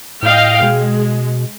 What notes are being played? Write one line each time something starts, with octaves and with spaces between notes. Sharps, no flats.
A2 D#5 F5 G5
B2 G#3